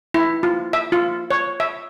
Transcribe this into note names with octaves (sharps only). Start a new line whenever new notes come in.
E4
F4
E5
F4
C#5
E5